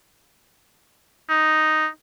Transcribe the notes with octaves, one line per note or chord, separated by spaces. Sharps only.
D#4